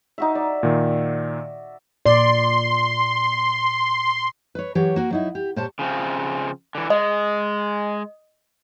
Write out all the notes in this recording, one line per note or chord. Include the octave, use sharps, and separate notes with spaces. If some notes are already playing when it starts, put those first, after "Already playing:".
D#4 F#4 E5
D5
A#2 D#3
A#2 D5 C6
B4 C#5
E3 F#3 G4 C#5
A#3 F#4
F#3 D#4 E4
G4
A#2 G4 C5 C#5 A5
C#3 F3 C4
D3 E3
G#3 D#5